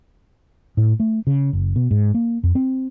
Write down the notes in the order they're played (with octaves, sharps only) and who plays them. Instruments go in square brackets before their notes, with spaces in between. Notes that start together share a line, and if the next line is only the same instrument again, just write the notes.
[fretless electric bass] A2
A3
C#3
F#1
B2
G#2
A#3
F2
C4